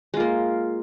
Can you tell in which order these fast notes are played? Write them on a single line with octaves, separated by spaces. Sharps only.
G#3 F4 A#3